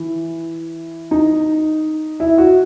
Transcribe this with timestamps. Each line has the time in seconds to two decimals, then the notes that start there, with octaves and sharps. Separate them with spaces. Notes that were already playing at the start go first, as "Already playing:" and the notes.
Already playing: E3
1.11 D#4
2.20 E4
2.38 F#4